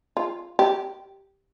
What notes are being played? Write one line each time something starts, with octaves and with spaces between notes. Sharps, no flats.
F4
G4